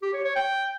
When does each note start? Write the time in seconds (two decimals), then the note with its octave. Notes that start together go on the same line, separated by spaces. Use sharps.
0.02 G4
0.13 C#5
0.24 C#5
0.36 G5